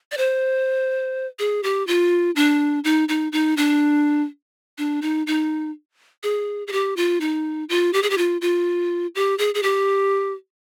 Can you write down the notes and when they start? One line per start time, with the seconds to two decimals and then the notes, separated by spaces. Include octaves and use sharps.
0.12 D5
0.17 C5
1.39 G#4
1.63 G4
1.87 F4
2.36 D4
2.84 D#4
3.09 D#4
3.32 D#4
3.57 D4
4.78 D4
5.02 D#4
5.27 D#4
6.23 G#4
6.67 G#4
6.72 G4
6.97 F4
7.21 D#4
7.69 F4
7.93 G4
8.03 G#4
8.10 G4
8.18 F4
8.41 F4
9.15 G4
9.38 G#4
9.54 G#4
9.63 G4